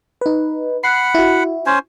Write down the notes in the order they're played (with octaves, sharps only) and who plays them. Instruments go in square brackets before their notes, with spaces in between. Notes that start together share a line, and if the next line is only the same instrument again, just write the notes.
[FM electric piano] D#4 B4
[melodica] F#5 B5 [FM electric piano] F#6 C7
[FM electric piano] E4 F#4
[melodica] C#4 C5 G#5